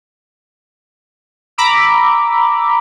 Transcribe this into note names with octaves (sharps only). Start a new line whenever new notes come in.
A#5 B5 D6 E6